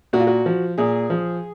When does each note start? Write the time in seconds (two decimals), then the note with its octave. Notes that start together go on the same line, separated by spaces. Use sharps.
0.13 A#2 F#4
0.20 F4
0.27 F#4
0.46 F3
0.78 A#2 G#4
1.10 F3